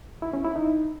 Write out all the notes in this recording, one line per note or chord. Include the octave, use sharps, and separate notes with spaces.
E4
C#4
E4
D#4